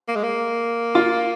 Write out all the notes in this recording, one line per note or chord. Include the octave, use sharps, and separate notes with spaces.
A#3
G#3
A#3
F4